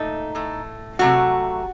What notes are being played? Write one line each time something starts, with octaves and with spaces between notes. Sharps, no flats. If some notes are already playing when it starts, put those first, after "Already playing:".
Already playing: A#2 A3 D#4
A2 A3
C3 F#3 A3 F#4